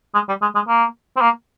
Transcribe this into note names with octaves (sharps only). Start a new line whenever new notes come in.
G#3
G3
G#3
G#3
A#3
C4
A#3